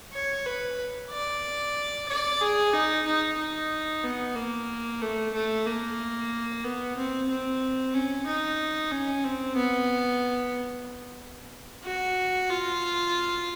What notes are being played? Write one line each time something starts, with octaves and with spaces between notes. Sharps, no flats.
C#5
B4
D5
D5
G#4
D#4
D#4
D#4
B3
A#3
A3
A3
A#3
B3
C4
C4
C#4
D#4
C#4
C4
B3
F#4
F4